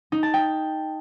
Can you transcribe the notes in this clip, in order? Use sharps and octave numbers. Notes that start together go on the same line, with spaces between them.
D#4
A5
G5